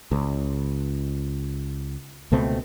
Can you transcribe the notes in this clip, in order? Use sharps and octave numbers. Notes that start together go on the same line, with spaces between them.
C#2
C#2 B2 A3 C4